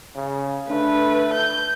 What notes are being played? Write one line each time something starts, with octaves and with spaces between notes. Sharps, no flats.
C#3
D3 A3 B4
G6